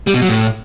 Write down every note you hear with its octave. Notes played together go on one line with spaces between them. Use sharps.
G3
B2
F#3
A2